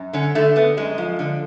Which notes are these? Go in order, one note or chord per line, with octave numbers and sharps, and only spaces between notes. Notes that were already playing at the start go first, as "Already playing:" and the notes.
Already playing: F#2
D3 C#4
D3 A3
D3 B3
F#2 G#3
F3
D3